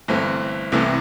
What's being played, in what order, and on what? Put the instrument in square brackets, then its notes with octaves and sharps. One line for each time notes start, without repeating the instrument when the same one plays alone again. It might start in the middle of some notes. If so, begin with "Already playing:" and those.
[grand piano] G1 G2 E3 A3 C4
C2 C3 E3 A3